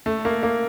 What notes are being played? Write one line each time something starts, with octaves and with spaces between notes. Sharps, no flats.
A3
A#3
A#3